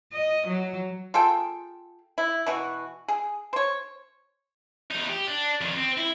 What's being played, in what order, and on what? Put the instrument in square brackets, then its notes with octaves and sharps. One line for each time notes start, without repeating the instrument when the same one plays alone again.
[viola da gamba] D#5
F#3
[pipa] F4 G#4 A4 G5
E4
B2 E3 F#4
G#4
C5 C#5
[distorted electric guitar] E2 D#4
G4
D4
F2 D#3
C4
E4